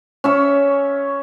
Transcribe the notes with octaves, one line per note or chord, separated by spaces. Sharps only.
C#4 E5 C#6